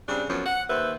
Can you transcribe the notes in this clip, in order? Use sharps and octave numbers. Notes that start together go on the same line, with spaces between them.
C#3 G3 C4 D4
F#2 F3 B3 C#4
F#5
D#2 B4 C5 E5